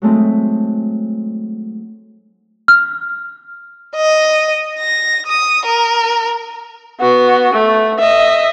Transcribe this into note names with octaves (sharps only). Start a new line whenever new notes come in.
F#3 G#3 A3 C4 D#4
F6
D#5
A#6
D#6
A#4
B3 F#4
A3
D#5 E5